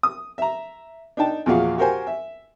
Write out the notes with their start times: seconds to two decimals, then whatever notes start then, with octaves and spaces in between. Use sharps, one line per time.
0.03 D#6
0.38 E5 A#5
1.17 D4 D#4 G5 A5
1.46 E2 A#2 F3 F#4 G#4 F5
1.78 F#4 G4 A#4 C5 G5 G#5
2.07 E5